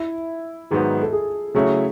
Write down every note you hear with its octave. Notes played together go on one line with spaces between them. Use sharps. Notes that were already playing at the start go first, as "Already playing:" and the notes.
Already playing: E4
G#2 D#3 F#3 B3 G#4
A4
G#4
C#3 F#3 A3 C#4 E4 G#4